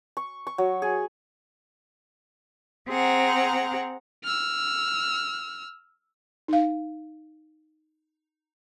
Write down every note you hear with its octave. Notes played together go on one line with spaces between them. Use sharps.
C#6
C#6
F#3
G#4
C4 G#4 F#5 A#5
E6 F6
D#4 F5